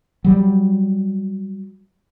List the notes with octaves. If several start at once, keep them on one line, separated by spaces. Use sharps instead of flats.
F#3 G3